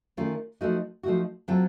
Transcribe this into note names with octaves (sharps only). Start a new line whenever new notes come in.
D#3 A3 C#4 F4
F3 A3 D#4 F#4
F3 A3 D#4 F#4
F#3 C4 F4 A4